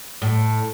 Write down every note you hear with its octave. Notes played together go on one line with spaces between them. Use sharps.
A2